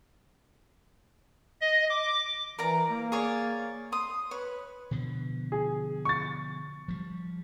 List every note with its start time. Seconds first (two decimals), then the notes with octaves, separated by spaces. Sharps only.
1.61 D#5
1.89 D6
2.59 E3 A#4 D5 A#5
2.90 A#3
3.12 G#4 C#5 D5
3.92 C6 D#6
4.31 B4 C#5
4.91 B2 D3 F3
5.52 G#4
6.05 C#6 A6
6.88 F3 G3